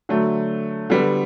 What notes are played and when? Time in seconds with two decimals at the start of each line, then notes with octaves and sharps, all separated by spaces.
0.09 D3 F#3 A3
0.90 D3 G3 B3